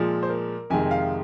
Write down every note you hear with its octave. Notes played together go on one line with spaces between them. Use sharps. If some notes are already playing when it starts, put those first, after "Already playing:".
Already playing: A#2 F3 G#3 G#4
C5
A#4
F2 C3 D#3 G#3 G#5
F5